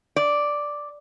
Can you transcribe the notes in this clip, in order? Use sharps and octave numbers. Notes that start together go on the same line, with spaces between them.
D5